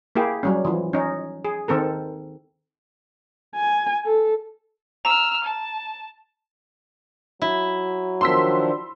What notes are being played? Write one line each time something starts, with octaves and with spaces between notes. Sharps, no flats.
A#3 E4 G4 G#4
F#3 G3 C#4
E3 F3
C#4 D#4
G#4
D#3 C4 A4 A#4
G#5
A4
A#5 E6 F6
A5
F#3 E4
D#3 F3 D4 C6 E6 B6